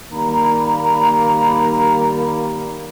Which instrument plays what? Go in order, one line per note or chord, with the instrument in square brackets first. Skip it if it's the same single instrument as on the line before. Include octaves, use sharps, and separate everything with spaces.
[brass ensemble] D#3 G3 A#3 [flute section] A#5 B5